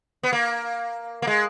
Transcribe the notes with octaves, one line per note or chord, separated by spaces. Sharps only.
B3
A#3
A#3
G#3